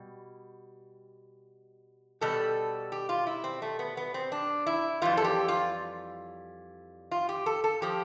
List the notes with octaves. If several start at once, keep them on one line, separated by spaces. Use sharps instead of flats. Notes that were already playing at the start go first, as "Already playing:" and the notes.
Already playing: B2 G3
B2 G3 A4
G4
F4
E4
C4
A3
B3
B3
C4
D4
E4
F2 E3 G3 F4
A4
G4
F4
F4
G4
A4
A4
F3 G4